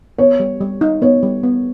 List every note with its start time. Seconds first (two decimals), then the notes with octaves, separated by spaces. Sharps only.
0.18 B3 C#5
0.40 G3
0.61 G3
0.81 D#4
1.02 B3 C#5
1.23 G3
1.43 B3